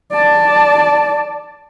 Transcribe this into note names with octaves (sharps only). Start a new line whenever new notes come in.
D5 A5